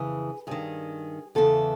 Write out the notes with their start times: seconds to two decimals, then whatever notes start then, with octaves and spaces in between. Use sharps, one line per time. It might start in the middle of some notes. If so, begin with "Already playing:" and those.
Already playing: F2 C#3 E3 G#4
0.47 G2 D#3 G#4
1.35 E2 C#3 E3 A4